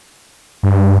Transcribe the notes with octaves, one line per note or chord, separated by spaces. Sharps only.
G2